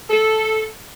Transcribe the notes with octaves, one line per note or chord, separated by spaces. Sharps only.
A4